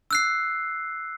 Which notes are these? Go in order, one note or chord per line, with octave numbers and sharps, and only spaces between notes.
E6 F#6 C7